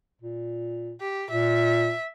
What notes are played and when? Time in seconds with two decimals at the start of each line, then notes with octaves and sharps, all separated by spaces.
0.21 A#2
1.01 G4
1.30 A#2 E5